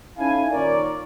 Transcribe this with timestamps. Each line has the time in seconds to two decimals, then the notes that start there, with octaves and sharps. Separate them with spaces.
0.17 C#4 D#4 E4 A4 F5 G#5
0.51 A#2 D#3 A#4 C#5 D5